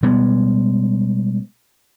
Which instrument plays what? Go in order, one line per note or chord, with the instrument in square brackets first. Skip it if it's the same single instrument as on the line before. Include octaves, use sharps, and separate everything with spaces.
[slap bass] B2 G3 G#3 B3